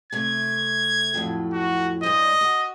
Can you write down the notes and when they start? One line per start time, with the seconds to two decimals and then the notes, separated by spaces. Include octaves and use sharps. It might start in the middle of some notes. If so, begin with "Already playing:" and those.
0.12 C3 A3 G#6
1.14 F2 A2 F#3
1.53 F#4
2.03 G2 C5 D#5
2.41 F#4